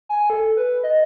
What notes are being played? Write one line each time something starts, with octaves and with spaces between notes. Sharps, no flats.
G#5
A4
B4
D#5